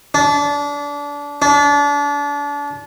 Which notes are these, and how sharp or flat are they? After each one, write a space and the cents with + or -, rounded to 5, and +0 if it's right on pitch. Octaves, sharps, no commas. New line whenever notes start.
D4 -25
D4 -30